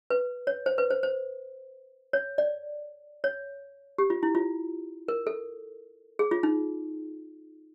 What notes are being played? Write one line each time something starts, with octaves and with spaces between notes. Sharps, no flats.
B4
C#5
C5
B4
C5
C5
C#5
D5
C#5
G4
F4
E4
F4
A#4
A4
G#4
F4
D#4